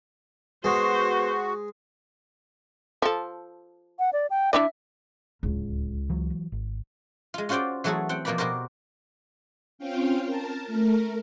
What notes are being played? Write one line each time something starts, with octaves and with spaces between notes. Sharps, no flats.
G#3 B3 F#4 C5
F3 A4
F#5
D5
G5
D4 E4 D5 E5
D1 C#2
E3 F#3
G#1
G#3 F4
C#4 F4 F#4 C5 D5 G5
E3 F#3 A3 F#4 G#4 A4
C4 F#5 G5
B2 F3 A#3 B4 D5 B5
B2 F#4 G4 A#4 C5
C4 C#4 F4 F5 G5
A#4 A5
A3 A#4